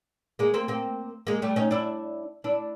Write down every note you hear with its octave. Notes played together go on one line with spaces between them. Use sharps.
G#3 A#3
A#3 C4
A#3 C4
G#3 A#3
G3 A3
C#4 D#4
D4 E4
D4 E4